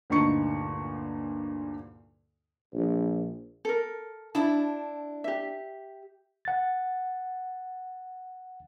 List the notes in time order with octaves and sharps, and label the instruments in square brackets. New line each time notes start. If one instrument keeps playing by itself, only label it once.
[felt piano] D2 G2 A#2 D#4 C#6 C#7
[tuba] A#1
[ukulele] A4 A#4
[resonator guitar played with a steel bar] D4 E4 [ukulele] A5
[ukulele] G4 E5
[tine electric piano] F#5 A6